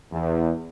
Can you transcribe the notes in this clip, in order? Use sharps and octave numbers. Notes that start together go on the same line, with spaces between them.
E2